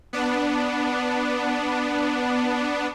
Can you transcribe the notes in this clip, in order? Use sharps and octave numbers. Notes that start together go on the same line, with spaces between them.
B3 D4